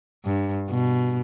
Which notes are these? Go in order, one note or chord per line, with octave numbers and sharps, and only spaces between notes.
G2
B2